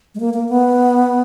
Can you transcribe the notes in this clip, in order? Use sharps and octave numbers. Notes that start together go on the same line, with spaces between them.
G#3
A#3
A#3
B3